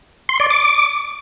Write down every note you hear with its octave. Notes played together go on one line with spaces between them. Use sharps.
C6
D5
D6